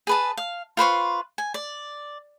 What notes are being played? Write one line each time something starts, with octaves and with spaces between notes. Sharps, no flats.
G#4 B4 A5
F5
F4 B4 C5 C#6
G#5
D5